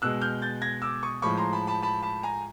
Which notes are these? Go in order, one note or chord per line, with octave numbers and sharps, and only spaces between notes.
B2 G#3 E6 F#6
F6 G6
G6 A6
G#6 A#6
D6 E6
C#6 D#6
A2 F3 G#3 B5 C#6
A#5 C6
A5 B5
A5 B5
A5 B5
A5 B5
G#5 A#5